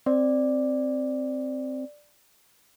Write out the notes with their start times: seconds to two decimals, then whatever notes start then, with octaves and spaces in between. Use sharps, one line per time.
0.06 C4 D5